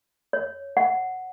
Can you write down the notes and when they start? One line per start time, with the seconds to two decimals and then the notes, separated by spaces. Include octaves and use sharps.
0.33 C#5
0.77 F#5